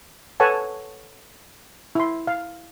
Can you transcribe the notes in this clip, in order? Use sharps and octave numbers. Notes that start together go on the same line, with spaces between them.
A4 B4 C#5 F#5 G#5 A5
E4 C6
F5